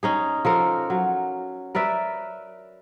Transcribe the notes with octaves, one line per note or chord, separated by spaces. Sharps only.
C#4 D#4 G#4
F3 A4 A#4
F#3
A#4 B4 D5 E5